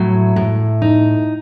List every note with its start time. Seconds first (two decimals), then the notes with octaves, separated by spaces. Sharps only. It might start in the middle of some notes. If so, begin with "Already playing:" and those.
Already playing: A2 F#3
0.36 A2
0.82 D#4